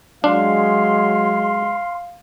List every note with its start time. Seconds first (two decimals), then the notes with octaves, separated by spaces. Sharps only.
0.24 F#3 G#3 D4 F5 C6